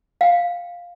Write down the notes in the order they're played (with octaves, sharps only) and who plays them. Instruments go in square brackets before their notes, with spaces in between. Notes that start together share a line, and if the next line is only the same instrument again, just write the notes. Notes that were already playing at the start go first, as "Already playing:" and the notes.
[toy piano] F5 G5